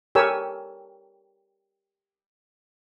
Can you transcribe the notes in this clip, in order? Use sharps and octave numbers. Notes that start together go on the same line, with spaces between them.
G4 A4 A#4 C#5 G#5 E6